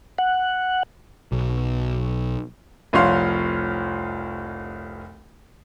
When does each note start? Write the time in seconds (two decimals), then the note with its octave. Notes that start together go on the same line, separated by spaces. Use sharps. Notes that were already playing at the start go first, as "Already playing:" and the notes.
0.18 F#5
1.32 B1
2.93 F1 C2 F3 C#5 F5 C6